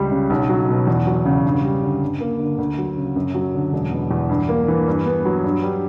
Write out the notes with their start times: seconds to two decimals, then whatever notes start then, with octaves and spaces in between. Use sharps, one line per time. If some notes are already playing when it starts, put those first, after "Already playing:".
Already playing: C#2 G3
0.11 C#3
0.30 B1
0.49 F#3
0.69 B2
0.87 E2
1.07 F#3
1.26 C#3
1.45 G2
1.64 G3
1.83 D3
2.02 G2
2.21 A#3
2.40 D3
2.58 D2
2.78 F#3
2.97 C#3
3.16 F#2
3.35 F#3
3.54 D3
3.72 E1
3.92 B2
4.11 E2
4.29 G2
4.49 A#3
4.68 E3
4.88 G2
5.06 B3
5.25 F#3
5.44 G2
5.63 G3